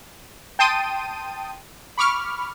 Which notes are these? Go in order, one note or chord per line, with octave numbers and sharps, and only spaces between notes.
G5 A5 C6 D#6 D#7
B5 C#6 D6 F6